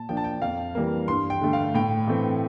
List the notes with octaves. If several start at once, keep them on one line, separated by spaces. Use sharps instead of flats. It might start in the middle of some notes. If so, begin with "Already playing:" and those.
Already playing: A#2 A5
F3 A#3 D4 G5
A5
G5
F2 F5
E3 G3 A#3
G2 C6
G5
D3 A3
F5
A2 G5
E3 A3 C4